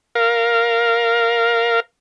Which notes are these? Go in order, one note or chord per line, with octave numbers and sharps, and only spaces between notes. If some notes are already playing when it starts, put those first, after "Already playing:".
A#4 F5